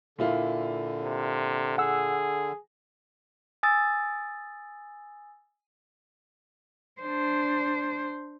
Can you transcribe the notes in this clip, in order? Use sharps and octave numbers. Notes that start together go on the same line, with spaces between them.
A#2 D3 E4 F4
C3
G#4 F#5 E6
G#5 D#6 E6 A6
D4 C5